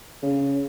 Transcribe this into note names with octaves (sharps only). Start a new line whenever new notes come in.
C#3